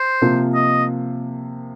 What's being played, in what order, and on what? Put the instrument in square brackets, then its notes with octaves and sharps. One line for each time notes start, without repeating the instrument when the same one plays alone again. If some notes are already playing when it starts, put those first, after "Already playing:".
Already playing: [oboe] C5
[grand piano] C3 F3 A#3
[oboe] D#5